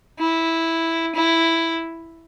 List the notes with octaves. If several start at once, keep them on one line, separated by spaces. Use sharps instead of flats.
E4
E4